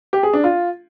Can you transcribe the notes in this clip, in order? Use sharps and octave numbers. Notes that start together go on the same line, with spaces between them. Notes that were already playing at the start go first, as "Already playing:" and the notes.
G4
G#4
D4
F4